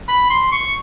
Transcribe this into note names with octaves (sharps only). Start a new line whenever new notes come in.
B5
C6
C#6